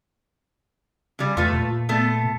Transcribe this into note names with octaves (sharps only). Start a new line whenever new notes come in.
C#3 G3
E2 A3 F4 B4
A#2
A3 B3 A4